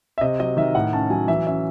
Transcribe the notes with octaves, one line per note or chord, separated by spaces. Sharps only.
E5
C3 D#5
F#3 D#5
D#3 E5
A2 F#5
C#4 A5
F#3 G#5
E3 E5
C#4 E5